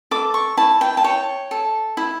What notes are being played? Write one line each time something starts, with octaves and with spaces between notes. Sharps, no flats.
A4 D6
C#6
E4 A5
G5
A5
C#5 G5
A4
E4